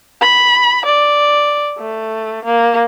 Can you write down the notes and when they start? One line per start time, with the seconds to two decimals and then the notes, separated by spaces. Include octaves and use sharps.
0.21 B5
0.85 D5
1.79 A3
2.44 A#3